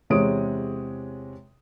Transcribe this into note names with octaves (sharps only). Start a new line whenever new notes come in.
E2 C3 G#3 C#5 D#6 D7